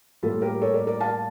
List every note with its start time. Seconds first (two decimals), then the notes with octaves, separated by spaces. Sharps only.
0.23 A2 G3 A#3 F4 A4
0.42 G4 A#4
0.61 A4 C#5
0.74 A#4 D5
0.87 A#4 D5
1.01 F5 A5